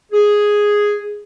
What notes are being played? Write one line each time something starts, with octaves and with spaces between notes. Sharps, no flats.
G#4